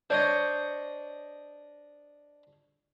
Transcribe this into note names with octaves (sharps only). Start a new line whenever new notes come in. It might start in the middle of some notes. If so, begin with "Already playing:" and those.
D4 C5 C#5 D#5